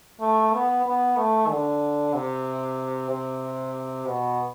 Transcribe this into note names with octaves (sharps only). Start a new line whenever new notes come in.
A3
B3
B3
A3
D3
C3
C3
B2